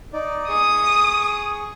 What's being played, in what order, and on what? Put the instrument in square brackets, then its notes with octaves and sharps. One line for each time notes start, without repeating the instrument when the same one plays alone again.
[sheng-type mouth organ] D#4 D5
[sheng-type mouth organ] G#4 C#6 [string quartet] D#6